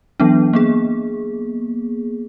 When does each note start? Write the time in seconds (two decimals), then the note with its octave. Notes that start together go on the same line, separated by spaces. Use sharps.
0.20 E3 F#3 B3 D4
0.53 A#3 B3 G#4